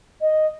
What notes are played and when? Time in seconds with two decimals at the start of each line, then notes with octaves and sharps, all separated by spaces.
0.21 D#5